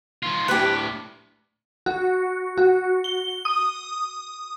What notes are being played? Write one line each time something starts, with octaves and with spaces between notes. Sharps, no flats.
D#3 F4
D2 A2 G4 B4
F#4
F#4
G7
D#6